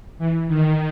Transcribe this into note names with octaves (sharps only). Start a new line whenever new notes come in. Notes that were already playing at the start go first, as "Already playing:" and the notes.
E3
D#3